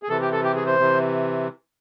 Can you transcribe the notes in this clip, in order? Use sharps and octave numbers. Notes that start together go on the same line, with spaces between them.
G#4
C3 E3 A4
G4
A4
G4
G#4
C5
C3 E3